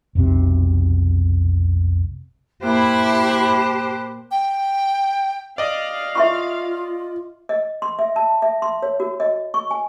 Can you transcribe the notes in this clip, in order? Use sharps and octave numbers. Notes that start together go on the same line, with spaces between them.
F1 B1 C3
A#2 A#3 E4 G4 C5 A5 B5 F#6
G5
D5 D#5 F5
F4 E5 C6 C#6
D#5
C6
E5
A5
E5
C6
C#5
F#4
D#5
C#6
G#5